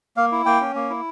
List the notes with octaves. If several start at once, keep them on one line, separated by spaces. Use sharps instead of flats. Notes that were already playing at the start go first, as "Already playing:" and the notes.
A#3 F5
E4
A#3 G5
C#4
A#3
E4